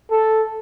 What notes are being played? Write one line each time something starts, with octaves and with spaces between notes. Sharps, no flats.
A4